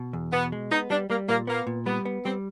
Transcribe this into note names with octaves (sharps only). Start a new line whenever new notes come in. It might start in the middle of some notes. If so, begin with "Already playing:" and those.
Already playing: B2
E2
B2 B3
G#3
B3 D#4
G3 D4
G3 A#3
A#2 A#3
A#3 B3
A#2
G3 B3
B3
G3 C4